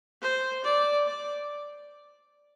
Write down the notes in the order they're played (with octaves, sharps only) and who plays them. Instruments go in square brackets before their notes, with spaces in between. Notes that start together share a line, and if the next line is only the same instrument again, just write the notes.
[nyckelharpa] C5
D5
D5